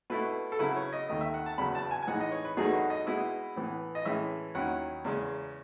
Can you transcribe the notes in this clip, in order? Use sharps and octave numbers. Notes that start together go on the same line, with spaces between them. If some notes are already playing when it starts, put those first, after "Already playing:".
B2 A3 E4 B4
A4
C#3 F#3 B3 E4 B4
C#5
D#5
D#2 D#3 A3 D#5
E5
F#5
A5
E2 C#3 F#3 B3 B5
A5
G#5
G#5
A2 E3 G#3 D#4 F#5
D#5
C#5
B4
E2 B2 F#3 A3 D#4 G#4
F#4
D#5
B2 G#3 B3 E4
A2 E3 B3
D#5
A2 E3 G#3 C#4 E5
D#2 D#3 F#3 C#4 E4 F#5
E2 C#3 G#3